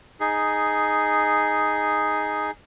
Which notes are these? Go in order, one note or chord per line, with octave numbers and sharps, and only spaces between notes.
D#4 G#4